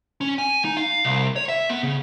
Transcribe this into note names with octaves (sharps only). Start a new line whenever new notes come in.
C#4
G#5
D#4
F5
C2
C#5
E5
B3
C#3